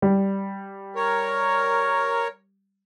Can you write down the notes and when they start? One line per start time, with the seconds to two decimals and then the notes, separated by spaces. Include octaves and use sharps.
0.02 G3
0.96 A#4 C#5